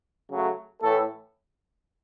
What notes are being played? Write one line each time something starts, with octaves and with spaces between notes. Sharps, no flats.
C#3 F#3 A3
A2 E3 A3 A4